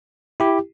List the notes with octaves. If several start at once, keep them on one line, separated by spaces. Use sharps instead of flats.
E4 G4